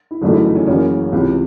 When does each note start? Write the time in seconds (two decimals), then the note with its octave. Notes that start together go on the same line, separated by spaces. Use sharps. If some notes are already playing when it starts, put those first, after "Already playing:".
0.11 E4
0.22 G1 F#2 C#3 E3 A3 D#4
0.33 E4
0.44 D#4
0.55 C#4
0.67 F#1 F#2 C#3 E3 C#4
1.12 C#2 C3 E3